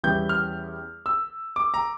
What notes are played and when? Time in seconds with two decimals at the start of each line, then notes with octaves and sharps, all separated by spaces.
0.03 E2 E3 G3 C#4 E4 G6
0.29 F6
1.06 E6
1.56 D6
1.74 A#5